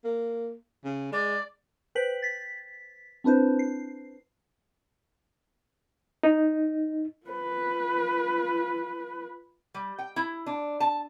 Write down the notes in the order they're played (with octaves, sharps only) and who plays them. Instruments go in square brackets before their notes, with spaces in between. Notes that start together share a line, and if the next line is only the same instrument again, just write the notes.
[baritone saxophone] A#3
C#3
[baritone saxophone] G#3 [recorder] D5
[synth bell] B4 C5 G5 B6 F#7
A6 B6
C4 D4 E4 B4 C5
C7
[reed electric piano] D#4
[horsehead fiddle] F4 B4
[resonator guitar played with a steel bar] G3
G5
E4
D4
A5